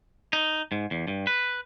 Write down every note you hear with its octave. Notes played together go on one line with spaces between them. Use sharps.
D#4
G#2
E2
G2
B4